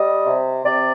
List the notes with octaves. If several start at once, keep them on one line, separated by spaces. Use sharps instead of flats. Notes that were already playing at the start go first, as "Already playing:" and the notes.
Already playing: G3 D#5
C3
C3 D5